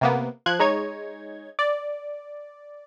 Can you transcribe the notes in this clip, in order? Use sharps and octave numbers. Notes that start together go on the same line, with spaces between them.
C3 A#3 B3
F3 F#6 G#6
G#3 D#4 C#5 G#6
D5